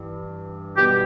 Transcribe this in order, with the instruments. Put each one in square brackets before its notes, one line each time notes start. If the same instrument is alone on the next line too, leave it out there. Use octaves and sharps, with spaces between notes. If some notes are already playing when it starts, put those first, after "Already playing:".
Already playing: [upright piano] G2 E3
[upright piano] B2 G3 B3 [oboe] G4